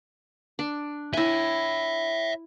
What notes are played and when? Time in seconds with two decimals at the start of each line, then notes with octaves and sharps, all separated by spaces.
0.59 D4
1.14 E4 C#5 E5 G#5